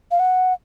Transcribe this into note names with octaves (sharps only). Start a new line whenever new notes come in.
F5
F#5